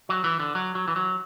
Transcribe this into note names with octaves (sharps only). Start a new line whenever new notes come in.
F#3
E3
D3
F#3
F#3
E3
F#3